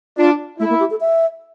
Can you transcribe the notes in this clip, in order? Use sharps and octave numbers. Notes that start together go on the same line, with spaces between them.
D4 F4
A3 E4
A#3
G4
A4
E5